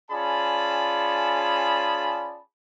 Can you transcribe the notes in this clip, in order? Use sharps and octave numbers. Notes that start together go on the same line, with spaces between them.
C#4 F4 G#4 D5 A5 B5